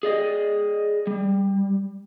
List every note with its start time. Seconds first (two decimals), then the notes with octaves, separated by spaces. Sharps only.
0.03 G#4 D5 D#5
1.07 G3